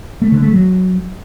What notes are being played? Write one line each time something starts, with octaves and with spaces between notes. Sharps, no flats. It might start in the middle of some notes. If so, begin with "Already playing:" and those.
A3
D3
A3
F#3